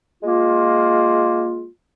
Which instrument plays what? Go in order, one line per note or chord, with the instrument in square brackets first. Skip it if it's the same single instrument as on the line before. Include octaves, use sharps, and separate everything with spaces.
[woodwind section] G#3 A#3 F4